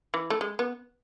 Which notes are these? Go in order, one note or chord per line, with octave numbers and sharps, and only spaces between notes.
E3
A3
G#3
B3